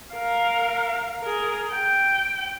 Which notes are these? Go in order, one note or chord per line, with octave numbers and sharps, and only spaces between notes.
A#4 F5
G#4 A#4
G5